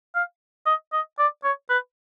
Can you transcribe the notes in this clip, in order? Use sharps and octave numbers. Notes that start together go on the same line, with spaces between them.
F5
D#5
D#5
D5
C#5
B4